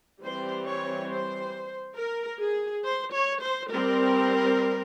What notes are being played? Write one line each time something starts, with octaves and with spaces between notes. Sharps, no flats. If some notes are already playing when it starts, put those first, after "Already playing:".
E3 G3 C4 C5
C#5
C5
A#4
G#4
C5
C#5
C5
G3 C4 A#4